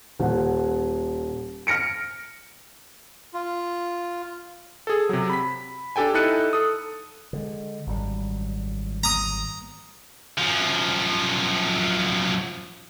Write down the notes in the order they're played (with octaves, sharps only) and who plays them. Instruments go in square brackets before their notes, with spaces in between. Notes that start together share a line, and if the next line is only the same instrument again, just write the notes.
[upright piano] D#1 F#5
F6 A#6 C#7 D7
[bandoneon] F4
[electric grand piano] G#4 A4
C3 F#3
B5 B6
D4 G4 A4 G5 G#5
D#4 E4 A4 F#6 C#7 D#7
A4 D#6
[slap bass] D3 G#3
G#1 F#2 G3
[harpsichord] A#5 D#6
[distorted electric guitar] F#2 F3